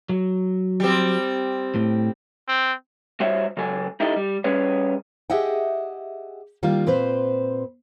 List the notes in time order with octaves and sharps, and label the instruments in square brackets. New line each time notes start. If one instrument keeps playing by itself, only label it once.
[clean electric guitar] F#3
[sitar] G3 C4
[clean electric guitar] A2
[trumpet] C4
[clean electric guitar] G3 F#4 C5 C#5 E5
C#3 F#3 A4 G#5
D#4 E4 G4 A4 D#5
G3
G3 C#4 G#4 B4 C#5
[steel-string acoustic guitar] G4 G#4 D#5 E5 F#5 G5
D#3 G3 A#3 F4
A#2 C4 B4 C5